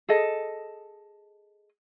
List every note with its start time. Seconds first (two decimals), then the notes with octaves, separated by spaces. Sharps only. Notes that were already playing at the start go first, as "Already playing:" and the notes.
0.09 G#4 A4 D#5